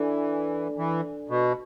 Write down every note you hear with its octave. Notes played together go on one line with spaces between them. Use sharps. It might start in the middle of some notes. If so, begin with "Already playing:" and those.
Already playing: E3 D4 A4 D5 G#5
E3
B2